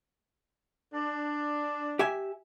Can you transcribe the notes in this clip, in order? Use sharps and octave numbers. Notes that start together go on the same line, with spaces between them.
D4
G4 E5 G#5